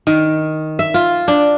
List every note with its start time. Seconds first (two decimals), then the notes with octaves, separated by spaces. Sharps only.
0.07 D#3
0.79 E5
0.94 F4
1.28 D4